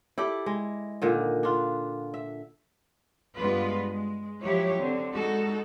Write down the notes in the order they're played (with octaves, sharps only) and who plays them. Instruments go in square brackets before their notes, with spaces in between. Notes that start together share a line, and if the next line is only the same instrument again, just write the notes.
[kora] E4 G4 A4 D5
G#3
A#2 D3 D#3
D4 F4
E5
[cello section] G2 G#3 B3 F4 B4
G#3
F3 F#3 E4 G4 C#5
D3 C4
G#3 D#4 F#4 A4